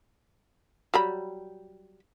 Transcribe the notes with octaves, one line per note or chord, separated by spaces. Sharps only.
F#3 G3 B5